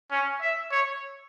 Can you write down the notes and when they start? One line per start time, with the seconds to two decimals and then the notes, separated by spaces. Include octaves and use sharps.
0.11 C#4
0.41 E5
0.72 C#5